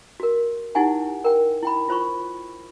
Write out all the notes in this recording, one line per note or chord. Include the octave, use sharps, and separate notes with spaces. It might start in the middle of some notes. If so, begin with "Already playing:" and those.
F#4 A#4
D#4 E4 G4 F#5 G#5
A#4 G5
E4 G5 B5
F4 C5 B5 C#6